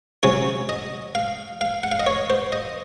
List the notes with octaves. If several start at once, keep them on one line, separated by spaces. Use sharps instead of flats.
C3 F#3 C#4 C#5
D#5
F5
F5
F#5
F5
D#5
C#5
C5
D#5